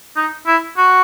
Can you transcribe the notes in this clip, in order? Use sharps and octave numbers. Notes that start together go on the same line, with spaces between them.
D#4
E4
F#4